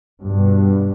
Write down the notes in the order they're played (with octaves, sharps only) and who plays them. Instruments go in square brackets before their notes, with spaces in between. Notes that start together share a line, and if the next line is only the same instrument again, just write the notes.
[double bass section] G2 B2